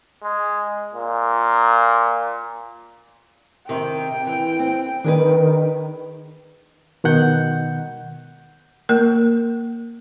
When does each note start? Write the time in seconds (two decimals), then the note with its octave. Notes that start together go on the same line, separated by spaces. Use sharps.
0.23 G#3
0.94 A#2
3.69 C3 D#3 G5
4.26 E3
4.59 C4
5.04 D#3 D4 G#4 B4
7.04 B2 D#3 F#5 G6
8.89 A#3 A#4